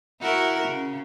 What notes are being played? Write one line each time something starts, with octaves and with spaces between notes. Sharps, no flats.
E4 F#4 A#4
C#3